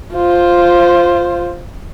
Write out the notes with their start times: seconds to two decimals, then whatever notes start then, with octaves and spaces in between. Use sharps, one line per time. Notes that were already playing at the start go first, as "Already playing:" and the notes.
0.14 F4 C5